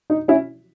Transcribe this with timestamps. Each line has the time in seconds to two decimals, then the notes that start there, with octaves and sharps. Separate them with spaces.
0.10 D#4
0.28 C#4 E4